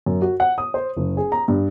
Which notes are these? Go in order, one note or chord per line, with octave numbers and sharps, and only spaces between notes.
F#2
F#4
F#5
D#6
C5
F#1
G#4
A#5
G2